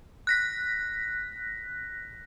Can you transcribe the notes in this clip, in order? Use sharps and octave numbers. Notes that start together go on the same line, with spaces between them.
F#6 A#6 B6